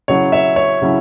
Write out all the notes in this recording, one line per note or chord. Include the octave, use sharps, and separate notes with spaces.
C#3 F#3 C#4 E4 C#5
C#5 E5
C#5
C#3 F#3 C#4 E4